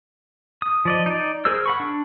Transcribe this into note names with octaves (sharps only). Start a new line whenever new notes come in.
D#6
F3 D5 D#5
D#4 D5
G#4 A#4 C5 E6
F#5 B5 C#6
D4